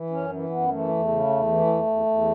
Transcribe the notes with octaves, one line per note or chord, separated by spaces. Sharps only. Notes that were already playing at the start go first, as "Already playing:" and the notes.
Already playing: E3
F#2 C#4
E3
F#2 B3
E3 A3
E2
C#3
E2
E3
E2
E2
E2